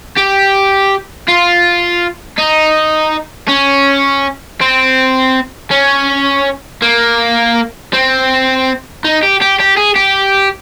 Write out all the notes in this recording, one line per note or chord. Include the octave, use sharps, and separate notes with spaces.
G4
F4
D#4
C#4
C4
C#4
A#3
C4
D#4
G4
G4
G4
G#4
G4